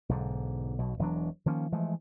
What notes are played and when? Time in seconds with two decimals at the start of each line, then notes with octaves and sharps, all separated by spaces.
0.09 B1 G#2 D3
0.79 B1 B2
0.99 E1 E3 F#3 D4
1.46 D#3 F3 A#3 C#4
1.72 E3 F3 G#3 A3